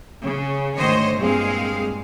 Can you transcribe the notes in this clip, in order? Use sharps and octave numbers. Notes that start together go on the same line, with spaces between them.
C#3
D2 G#2 D#3 C5 C#5 D#5
G2 A#2 G#3 C4 G#4 F5